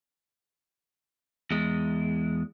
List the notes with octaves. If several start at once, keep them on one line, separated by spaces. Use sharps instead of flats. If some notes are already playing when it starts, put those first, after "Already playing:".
E2 G#3